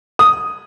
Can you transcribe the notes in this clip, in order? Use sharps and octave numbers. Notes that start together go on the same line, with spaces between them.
D#6